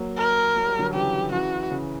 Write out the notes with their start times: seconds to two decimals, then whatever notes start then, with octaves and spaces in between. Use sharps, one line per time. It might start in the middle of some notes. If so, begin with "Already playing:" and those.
Already playing: F#3 A#3
0.18 A#4
0.56 F#3
0.67 G3
0.79 D3 F#3
0.94 C#3 E3 G4
1.32 C#3 E3 F#4
1.70 C#3